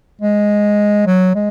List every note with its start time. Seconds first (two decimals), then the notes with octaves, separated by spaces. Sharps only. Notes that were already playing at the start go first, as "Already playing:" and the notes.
0.21 G#3
1.07 F#3
1.35 G#3